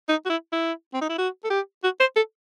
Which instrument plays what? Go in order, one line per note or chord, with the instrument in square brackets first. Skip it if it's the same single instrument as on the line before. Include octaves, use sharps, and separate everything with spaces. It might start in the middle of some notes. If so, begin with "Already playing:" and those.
[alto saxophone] D#4
F#4
E4
E4
C4
D#4
E4
F#4
A4
G4
F#4
C5
A4